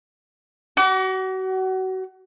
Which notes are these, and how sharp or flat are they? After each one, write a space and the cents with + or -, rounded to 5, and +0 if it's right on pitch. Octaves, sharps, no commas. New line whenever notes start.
F#4 +30 D6 -35